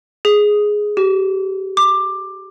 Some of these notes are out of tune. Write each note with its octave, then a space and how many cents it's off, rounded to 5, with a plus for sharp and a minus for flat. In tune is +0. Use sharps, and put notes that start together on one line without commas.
G#4 +5
G4 -40
D6 +15